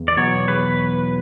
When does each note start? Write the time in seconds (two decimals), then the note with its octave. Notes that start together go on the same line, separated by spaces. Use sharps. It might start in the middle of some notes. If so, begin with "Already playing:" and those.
Already playing: E2
0.08 D5
0.17 B2 F#3 B3 C#5
0.48 E2 B4